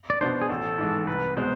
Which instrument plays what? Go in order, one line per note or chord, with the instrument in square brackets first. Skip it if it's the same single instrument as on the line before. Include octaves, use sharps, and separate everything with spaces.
[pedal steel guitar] D5
[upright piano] B2 B3 D4 [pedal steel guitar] C5
[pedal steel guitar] G#4
[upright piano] A1 [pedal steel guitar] A4
[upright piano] G#2 E3 G#3
[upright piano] C2 [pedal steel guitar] B4
[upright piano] B2 G#3 B3 [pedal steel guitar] C5